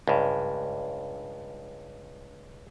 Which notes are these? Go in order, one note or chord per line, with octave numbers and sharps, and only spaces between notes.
C#2 G2